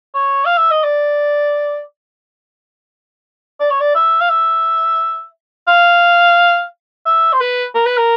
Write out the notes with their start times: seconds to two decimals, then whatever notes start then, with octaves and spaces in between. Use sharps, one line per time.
0.14 C#5
0.45 F5
0.57 E5
0.71 D#5
0.83 D5
3.60 D5
3.70 C#5
3.80 D5
3.95 E5
4.21 F5
4.29 E5
5.68 F5
7.06 E5
7.33 C5
7.40 B4
7.75 A#4
7.86 B4
7.97 A#4